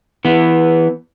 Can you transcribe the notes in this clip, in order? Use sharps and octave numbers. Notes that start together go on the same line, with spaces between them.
E3 B3